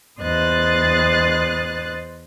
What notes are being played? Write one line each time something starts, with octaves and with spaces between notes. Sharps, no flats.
E2 C5 D#5 D#6 F#6 A6